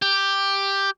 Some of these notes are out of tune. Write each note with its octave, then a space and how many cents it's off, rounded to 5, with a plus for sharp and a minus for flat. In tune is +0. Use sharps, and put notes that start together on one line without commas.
G4 +5